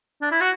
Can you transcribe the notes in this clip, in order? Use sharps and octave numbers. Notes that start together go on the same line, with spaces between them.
D4
E4
F#4